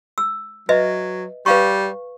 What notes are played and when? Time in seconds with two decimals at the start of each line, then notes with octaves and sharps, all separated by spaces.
0.18 E6
0.69 F#3 B4 D#5 E5
1.46 G3 B4 F5 C#6